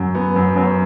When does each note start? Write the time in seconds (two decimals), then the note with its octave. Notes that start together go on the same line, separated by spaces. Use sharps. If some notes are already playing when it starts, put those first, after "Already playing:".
Already playing: F#2
0.15 B3
0.36 F#2
0.56 F#2